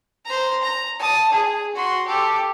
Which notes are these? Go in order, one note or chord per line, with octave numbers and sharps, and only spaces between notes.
C5 A#5
A#5
A5 D#6
G#4
F#4 C6
G4 A4